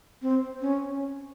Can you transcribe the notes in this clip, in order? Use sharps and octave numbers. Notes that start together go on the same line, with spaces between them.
C4
C#4